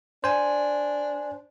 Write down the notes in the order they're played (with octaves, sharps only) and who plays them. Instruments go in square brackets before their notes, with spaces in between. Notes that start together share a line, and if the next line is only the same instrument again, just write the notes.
[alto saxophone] D4 [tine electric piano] C5 G#5